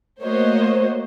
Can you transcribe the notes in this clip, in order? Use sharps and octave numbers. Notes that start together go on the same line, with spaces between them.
A3 A#3 F#4 C5 C#5 D#5